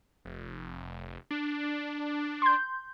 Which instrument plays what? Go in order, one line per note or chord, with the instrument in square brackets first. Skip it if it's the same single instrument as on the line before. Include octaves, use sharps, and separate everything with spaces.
[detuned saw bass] F1
D4
[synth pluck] C6 G6